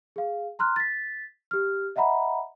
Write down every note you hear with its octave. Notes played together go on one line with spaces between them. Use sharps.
G#4 F5
A#5 C6 F6 F#6
A6 B6
G4 F6
D#5 E5 F#5 A#5 B5